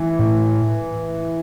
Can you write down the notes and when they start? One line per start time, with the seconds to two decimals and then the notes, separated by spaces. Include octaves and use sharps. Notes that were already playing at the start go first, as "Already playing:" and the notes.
Already playing: E3
0.19 A2